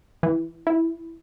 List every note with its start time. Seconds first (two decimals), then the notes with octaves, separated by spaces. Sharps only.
0.23 E3
0.67 E4